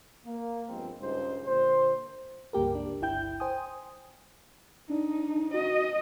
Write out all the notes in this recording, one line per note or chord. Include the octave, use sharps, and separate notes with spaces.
A#3
G2 F3 G#3 B3 C4
C#2 G2 C#3 D#4 C5
A#2 D3 C5
C#2 G2 A#3 G4 A#4
D4
G1 C#2 E4 G5 G6
C5 G5 G#5 D#6
D4 D#4
F#4 D#5